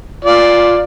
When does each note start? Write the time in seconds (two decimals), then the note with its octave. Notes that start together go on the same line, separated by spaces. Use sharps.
0.25 F4 D5